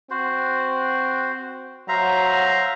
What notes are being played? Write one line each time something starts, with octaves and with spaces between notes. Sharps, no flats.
C4 F#4 C5
F#3 C5 E5 F5 A#5